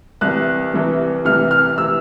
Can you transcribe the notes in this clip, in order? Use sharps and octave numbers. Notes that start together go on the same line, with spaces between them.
C2 C3 E3 F#6
C2 C3 E3
C2 C3 E3 F6
F6
C3 E3 E6